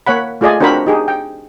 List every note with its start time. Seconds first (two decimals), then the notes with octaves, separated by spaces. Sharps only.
0.06 A#3 C#5 F#5 B5
0.41 A3 F4 G#4 D5 D#5 G#5
0.60 C4 D4 F#4 A#4 C5 B5
0.86 D#4 G4 G#4
1.08 G5